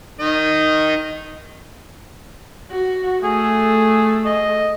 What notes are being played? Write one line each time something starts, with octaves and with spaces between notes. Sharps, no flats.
D#3 D#5
F#4
A3 G#4
D#5